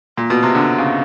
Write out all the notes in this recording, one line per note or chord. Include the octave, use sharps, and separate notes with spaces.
A#2
B2
C3
D3
C#3